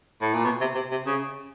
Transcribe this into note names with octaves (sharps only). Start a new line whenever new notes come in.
A2
A#2
B2
C3
C3
C3
C#3